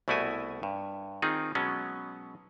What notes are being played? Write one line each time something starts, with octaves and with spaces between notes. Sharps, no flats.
C2 B2 A3 E4 F#4 G#5
G2
D#3 C4 D#4 F4 G#4
B2 F#3 G#3 B3 C#4